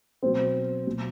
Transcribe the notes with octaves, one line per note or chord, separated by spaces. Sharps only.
B2 F#3 C4
B2 F#3